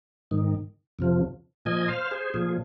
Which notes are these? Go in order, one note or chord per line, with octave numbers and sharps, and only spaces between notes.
G#2 D#3
F2 C3 F3
A#2 F3 D#5 G#5
C5 F5
G#4 C5
A#2 F3 G#4